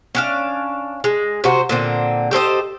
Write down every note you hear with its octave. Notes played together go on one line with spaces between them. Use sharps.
C#4 D4 F5
G#3
C3 F#4 C5
A#2 D3 C4
G4 A4 C5 D#5